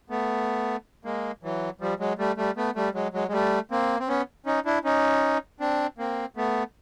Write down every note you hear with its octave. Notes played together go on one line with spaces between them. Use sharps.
A3 B3
G#3 A#3
E3 F#3
F3 G3
F#3 G#3
G3 A3
G3 A3
A3 B3
G3 A3
F#3 G#3
F#3 G#3
G#3
G3 A3
A#3 C4
C4
B3 C#4
C#4 D#4
D4 E4
C#4 D#4
C4 D4
A#3 C4
A3 B3